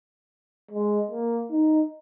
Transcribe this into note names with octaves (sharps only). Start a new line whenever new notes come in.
G#3
A#3
D#4